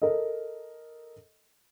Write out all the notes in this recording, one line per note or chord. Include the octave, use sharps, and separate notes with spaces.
A4 A#4 D#5